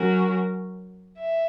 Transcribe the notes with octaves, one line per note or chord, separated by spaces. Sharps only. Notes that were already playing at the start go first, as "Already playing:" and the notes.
Already playing: F#3 C#4 F#4 A#4
E5